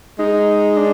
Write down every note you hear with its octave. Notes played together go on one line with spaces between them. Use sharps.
G#3 D#4
D4